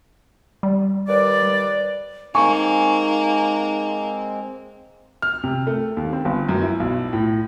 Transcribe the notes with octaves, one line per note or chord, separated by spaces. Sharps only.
G3
D#2 B4 D5
G#3 A#3 C4 D#4 G#5 C#6
F6
C3
A3
D#2
C4
G1
F#2
E4
B1
A2